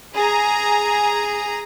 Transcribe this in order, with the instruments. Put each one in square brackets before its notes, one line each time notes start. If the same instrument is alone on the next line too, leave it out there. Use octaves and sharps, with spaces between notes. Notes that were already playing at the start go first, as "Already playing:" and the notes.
[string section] G#4 A#5